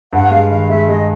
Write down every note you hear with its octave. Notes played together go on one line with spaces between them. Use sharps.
G2 F#5
G#3 F5
D#3 F5
G#3 E5
G#3 D#5